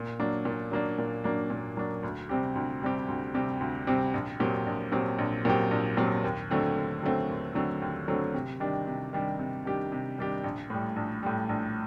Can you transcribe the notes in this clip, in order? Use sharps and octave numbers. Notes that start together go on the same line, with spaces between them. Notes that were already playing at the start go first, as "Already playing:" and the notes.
Already playing: A#2
F#3 A#3 D4
A#2
F#3 A#3 D4
A#2
F#3 A#3 D4
A#2
F#3 A#3 D4
D2
C3 G3 C4 G4
D2
C3 G3 C4 G4
D2
C3 G3 C4 G4
D2
C3 G3 C4 G4
A#1
A#2 F#3 C4 G4
A#1
A#2 F#3 C4 G4
A#1
A#2 F#3 C4 G4
A#1
A#2 F#3 C4 G4
D#2
D3 F#3 A3 C4
D#2
D3 F#3 A3 C4
D#2
D3 F#3 A3 C4
D#2
D3 F#3 A3 C4
C3
D#3 G3 D4 G4
C3
D#3 G3 D4 G4
C3
D#3 G3 D4 G4
C3
D#3 G3 D4 G4
A#1
A2 G3
A#1
A2 G3
A#1